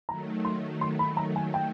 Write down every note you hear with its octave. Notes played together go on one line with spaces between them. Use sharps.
D#3 F#3 A3 A#5
C6
C6
B5
A#5
G#5
G5